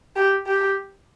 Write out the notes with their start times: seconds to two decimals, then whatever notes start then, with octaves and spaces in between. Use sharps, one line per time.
0.16 G4
0.46 G4